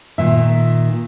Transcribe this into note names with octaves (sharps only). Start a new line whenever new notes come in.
A#2 D#3 E5